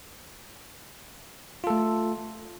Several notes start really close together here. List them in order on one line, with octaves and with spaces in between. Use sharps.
F4 A4 A3